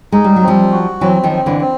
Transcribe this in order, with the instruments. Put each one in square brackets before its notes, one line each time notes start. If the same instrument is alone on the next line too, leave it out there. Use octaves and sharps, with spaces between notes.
[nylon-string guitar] G#3 [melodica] D#4
[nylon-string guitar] G3
F#3
[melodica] C4
[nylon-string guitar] F3 G3
[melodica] F#4
[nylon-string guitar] E3 F#3 [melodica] C4
[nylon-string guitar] D#3 F3
[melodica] C4
[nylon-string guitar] D3 E3
[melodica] C4